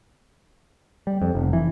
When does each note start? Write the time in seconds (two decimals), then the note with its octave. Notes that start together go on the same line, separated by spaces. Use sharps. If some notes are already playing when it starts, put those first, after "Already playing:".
1.07 G3
1.22 F2
1.35 F1
1.53 E3